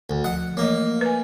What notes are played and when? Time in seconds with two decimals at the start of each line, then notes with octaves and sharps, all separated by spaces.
0.10 D2
0.24 F3 F#5
0.57 E3 A3 A#3 D#5
1.01 B4 G#5